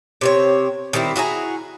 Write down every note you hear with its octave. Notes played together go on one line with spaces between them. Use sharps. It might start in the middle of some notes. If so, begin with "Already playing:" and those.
C3 C4 C#5
D#3 G3 C4 E4
E4 F#4 G#4 A#5